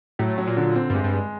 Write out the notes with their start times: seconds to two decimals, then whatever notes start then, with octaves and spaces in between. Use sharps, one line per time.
0.19 A2 F#3
0.38 F#3
0.47 A#2
0.57 D3
0.75 C4
0.90 G2
0.95 G#3
1.04 G2
1.13 G#3